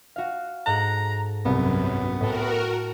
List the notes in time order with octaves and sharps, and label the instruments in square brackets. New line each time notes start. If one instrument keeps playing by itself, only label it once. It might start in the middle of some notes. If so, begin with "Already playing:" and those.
[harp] F#4 F5
[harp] G#2 A4 F#6 [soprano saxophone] A#5
[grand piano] C2 [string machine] F#2 [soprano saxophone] B3
[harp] A2 A4 [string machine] F#4 A#4